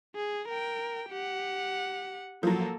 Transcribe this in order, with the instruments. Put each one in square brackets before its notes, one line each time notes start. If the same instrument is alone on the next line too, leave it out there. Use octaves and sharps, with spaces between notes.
[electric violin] G#4
A#4 G5
G4 F#5
[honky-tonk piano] F3 F#3 [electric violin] A#3 A4